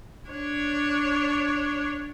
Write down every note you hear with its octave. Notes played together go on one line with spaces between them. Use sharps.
D4 C#5